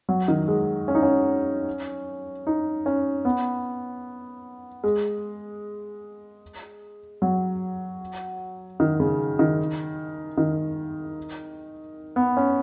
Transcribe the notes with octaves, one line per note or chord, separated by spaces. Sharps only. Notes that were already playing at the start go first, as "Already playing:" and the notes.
F#3
D#3
G#3
C#4
D#4
C#4
D#4
C#4
B3
G#3
F#3
D#3
C#3
D#3
D#3
B3
C#4